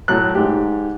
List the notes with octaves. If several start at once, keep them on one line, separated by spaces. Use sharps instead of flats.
A2 F#3 F#6
G#2 G4